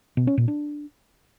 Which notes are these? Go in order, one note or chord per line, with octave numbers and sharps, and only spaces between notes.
B2
C#4
A#2
D4